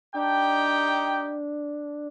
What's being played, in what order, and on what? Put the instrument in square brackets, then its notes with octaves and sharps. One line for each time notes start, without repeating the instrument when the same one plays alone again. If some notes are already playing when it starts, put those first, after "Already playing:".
[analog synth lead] D4 [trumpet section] D#4 G4 G5